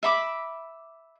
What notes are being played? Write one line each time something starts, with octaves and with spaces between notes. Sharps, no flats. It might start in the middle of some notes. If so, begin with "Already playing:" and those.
E5 B5 D6